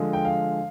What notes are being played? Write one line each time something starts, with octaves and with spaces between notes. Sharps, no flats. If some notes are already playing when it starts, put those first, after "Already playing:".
Already playing: D3 F3 G#3
G5
F5